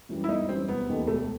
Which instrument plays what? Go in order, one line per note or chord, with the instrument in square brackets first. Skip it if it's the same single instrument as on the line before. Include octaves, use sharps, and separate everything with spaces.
[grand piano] F#2 E3 G3
[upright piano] E4
[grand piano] G1 [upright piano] D#4
[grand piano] F#2 E3 G3 [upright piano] C4
[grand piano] E1 [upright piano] B3
[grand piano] D#2 D#3 A3
[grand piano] E1 [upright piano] A3